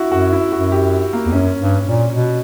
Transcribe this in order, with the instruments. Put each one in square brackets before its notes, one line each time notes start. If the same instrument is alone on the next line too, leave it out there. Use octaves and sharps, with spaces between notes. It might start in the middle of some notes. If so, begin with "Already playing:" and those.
Already playing: [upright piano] E4 F#4
[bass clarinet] F#2 [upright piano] F#4
[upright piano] E4
[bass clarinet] F#2 [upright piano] F#4
[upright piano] G4
A#3
[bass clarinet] E2
[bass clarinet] F#2 [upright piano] C#4
[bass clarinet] G2
A#2
B2